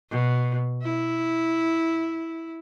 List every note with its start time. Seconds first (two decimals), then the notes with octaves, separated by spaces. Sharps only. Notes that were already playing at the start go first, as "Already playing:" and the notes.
0.10 B2
0.82 E4